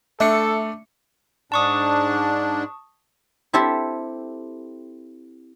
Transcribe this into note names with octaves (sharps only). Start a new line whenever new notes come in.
A3 D4 A4 E5 C#7
G#2 D4 A5 C#6 D#6
C4 E4 G4 A4 C5 E5